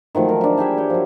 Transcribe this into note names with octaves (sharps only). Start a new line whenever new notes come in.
D#3 F3 F#3 A3
A#4
D4 E5
E4 G4 G#4 E5
C#5 G5
F3 F#3